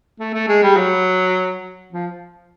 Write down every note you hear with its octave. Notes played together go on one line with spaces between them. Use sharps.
A3
A3
G#3
G3
F#3
F3